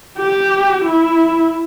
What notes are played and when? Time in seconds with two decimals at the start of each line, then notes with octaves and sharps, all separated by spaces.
0.18 G4
0.85 E4